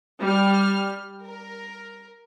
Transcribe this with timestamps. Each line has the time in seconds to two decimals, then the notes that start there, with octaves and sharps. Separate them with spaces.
0.21 G3 F6
1.23 A#4